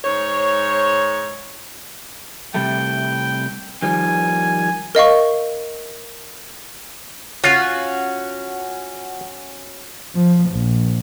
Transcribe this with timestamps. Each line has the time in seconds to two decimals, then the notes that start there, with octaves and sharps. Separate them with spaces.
0.05 G#2 C5 C#5
2.54 C3 G3 A3 G5
3.82 D#3 F3 G3 G#5
4.95 A#4 D#5 F5 C#6
7.44 C#4 F4 F#4 F#5
10.15 F3
10.50 A#1